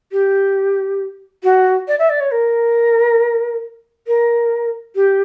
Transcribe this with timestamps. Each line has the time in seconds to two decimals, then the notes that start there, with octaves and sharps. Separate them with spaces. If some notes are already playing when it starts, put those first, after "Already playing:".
0.11 G4
1.43 F#4
1.87 D5
1.98 E5
2.09 D5
2.20 C#5
2.31 A#4
4.07 A#4
4.95 G4